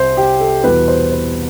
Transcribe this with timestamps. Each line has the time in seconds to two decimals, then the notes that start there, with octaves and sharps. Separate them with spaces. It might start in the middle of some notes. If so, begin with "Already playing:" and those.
Already playing: C2 C3 C5
0.17 G4
0.40 A4
0.64 E2 B2 G3 B4
0.88 C5
1.12 B4